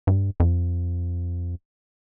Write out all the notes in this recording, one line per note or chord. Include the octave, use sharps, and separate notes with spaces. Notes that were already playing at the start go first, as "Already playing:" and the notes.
G2
F2